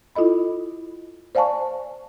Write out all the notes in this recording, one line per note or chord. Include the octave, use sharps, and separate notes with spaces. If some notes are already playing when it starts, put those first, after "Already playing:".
E4 F4 A4 D#5 B5
C5 D5 F5 G#5 A5 C#6